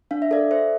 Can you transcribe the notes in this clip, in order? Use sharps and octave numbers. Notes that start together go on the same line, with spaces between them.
D4 F5
E5
A4 D5 F5
A4 C5 E5